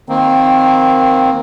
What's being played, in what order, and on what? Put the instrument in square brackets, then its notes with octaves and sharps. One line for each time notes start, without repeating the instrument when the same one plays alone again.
[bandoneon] D#3 A#3 C4